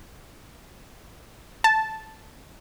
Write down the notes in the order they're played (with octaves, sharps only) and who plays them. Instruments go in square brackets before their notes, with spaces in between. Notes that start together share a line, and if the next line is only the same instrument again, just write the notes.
[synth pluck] A5